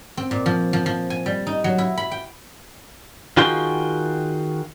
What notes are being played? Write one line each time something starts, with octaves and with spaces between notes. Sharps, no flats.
C4
A#2
F3
F3
F3
G#5
G3
D#4
F#3
E4
B5
G5
D#3 F4 F#4 G#4 G5 C6